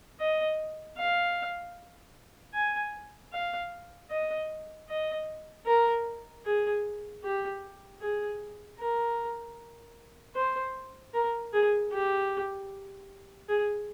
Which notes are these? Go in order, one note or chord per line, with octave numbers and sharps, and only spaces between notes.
D#5
F5
G#5
F5
D#5
D#5
A#4
G#4
G4
G#4
A#4
C5
A#4
G#4
G4
G#4